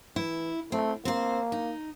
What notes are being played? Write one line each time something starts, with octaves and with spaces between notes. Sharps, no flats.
E3 E4
A3 C4
A#3 C4 C5
D#4